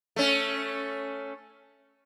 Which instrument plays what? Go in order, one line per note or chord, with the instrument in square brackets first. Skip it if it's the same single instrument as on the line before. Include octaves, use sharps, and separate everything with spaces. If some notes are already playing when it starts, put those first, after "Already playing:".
[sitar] A3 C#4